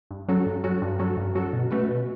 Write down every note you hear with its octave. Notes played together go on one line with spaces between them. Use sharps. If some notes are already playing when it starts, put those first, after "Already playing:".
G2
F#3 C#4 F#4 A4
G2
F#3 C#4 F#4 A4
G2
F#3 C#4 F#4 A4
G2
F#3 C#4 F#4 A4
B2
A3 C#4 F#4 B4
B2